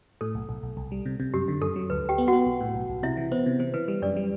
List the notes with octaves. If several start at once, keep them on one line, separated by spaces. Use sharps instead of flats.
A2 A4
B1
B1
B1
C2
G3
C3
C3
F#2 G4
D3
F#2 A4
F#3
D2 B4
D2 G4 G5
B3
F#4 F#5
B3
B1
A2
B1
B1
C3 E4 E5
E3
B3 C5
C3
E3 C5
E3 B4
G3 B4
F#2 D4 D5
G3